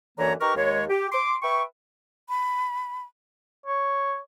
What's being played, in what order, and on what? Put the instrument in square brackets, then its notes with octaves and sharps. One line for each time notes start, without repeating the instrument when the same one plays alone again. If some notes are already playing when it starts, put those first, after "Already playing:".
[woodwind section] F#2 D3 E3 A#3 C#5 A#5
D#4 G4 A#4 B4 A#5 C#6
D#2 G#3 C#5
G4
C6 D6
B4 E5 G5 C#6
[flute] B5
[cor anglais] C#5